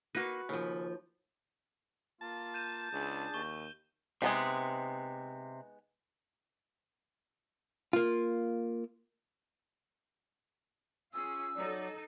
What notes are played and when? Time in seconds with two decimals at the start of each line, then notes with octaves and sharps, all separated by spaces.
0.15 A#3 D#4 F#4 B4
0.49 D#2 C#3 F3
2.21 A#3 F4 A5
2.54 G6 D#7 E7
2.93 C#2 D4 G#4
3.34 D#2 C#6 G7
4.22 C3 G#3 B3 D#4
7.93 A#3 F4
11.14 C#4 F4 G#4 E6
11.57 F#3 D#4 A4 D5